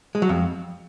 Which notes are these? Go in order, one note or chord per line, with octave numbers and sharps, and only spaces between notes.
G#3
F#3
F2